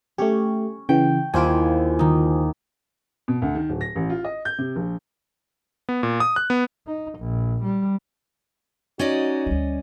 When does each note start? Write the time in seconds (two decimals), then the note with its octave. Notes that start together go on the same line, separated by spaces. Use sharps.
0.18 A3 C#4 G4
0.89 C#3 E3 G5
1.34 D#2 E4 F4 C5 G#5 D7
1.99 D#3 D#4
3.28 B2
3.42 D2
3.55 D#3
3.69 D1
3.81 A#6
3.96 A1
4.10 F4
4.24 D#5
4.45 G6
4.58 C3
4.76 A#1
5.89 B3
6.03 A#2
6.20 D#6
6.36 F#6
6.50 B3
6.87 D#4
7.19 A#1
7.63 G3
8.99 C#4 D#4 F#4 D5 D#5
9.46 D2 G3